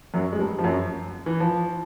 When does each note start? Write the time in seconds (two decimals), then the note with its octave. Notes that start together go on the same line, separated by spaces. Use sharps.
0.14 F#2 F#3
0.33 G#3
0.39 G2 G3
0.59 F3
0.64 F#2 F#3
1.26 E3
1.40 F3